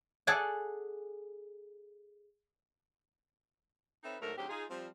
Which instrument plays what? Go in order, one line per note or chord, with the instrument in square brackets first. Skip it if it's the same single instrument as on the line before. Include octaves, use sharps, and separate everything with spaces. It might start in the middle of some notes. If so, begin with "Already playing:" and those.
[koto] G#4 A4 D5 F#5 G#5
[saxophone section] C4 D#4 A4 B4 C#5 E5
G#2 D3 F#3 A3 A#4
D2 G#2 F#3 C4 G4
D#4 F4 G#4
F3 G3 C4